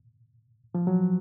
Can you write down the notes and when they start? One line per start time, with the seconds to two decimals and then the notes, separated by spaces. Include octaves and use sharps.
0.75 F3
0.87 F#3